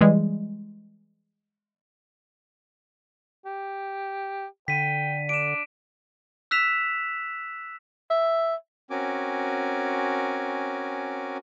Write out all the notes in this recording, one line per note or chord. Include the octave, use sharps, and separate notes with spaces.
E3 G3 G#3
G4
D3 G5 B6 D#7
D4 D7 E7
E6 F#6 B6 E7 F7
E5
C4 C#4 F#4 A#4 G#5 D6